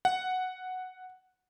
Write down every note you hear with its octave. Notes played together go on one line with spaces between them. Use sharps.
F#5